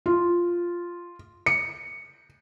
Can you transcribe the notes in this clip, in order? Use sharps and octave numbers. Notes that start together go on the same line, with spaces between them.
F4
C#7